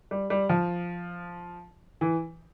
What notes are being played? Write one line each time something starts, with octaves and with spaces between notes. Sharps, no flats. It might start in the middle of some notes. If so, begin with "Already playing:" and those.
G3
G3
F3
E3